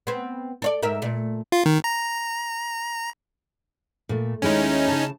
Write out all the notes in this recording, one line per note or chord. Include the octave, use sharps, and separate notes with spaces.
B3 C4
A4 C#5 D5
G#2 A#4 E5
A#2 A3
F4
D#3
A#5
A#2 A3
D#2 G#3 C#4 D#4 E4
C#3 A5